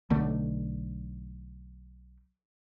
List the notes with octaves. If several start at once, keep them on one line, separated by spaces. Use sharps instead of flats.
B1 D3 A3